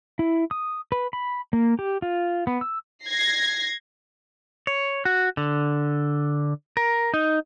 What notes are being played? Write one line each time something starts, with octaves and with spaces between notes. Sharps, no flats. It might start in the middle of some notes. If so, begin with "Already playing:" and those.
E4
D#6
B4
B5
A#3
G4
F4
B3
E6
G#6 A#6 C7
C#5
F#4
D3
A#4
D#4